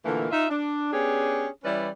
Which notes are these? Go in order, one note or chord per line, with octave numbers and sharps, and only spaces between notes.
A#2 D3 E3 A3 A#3
D#4 F4 E5
D4
B3 C#4 D4 G4 G#4 C#5
E3 G3 C#4 E4 B4 D5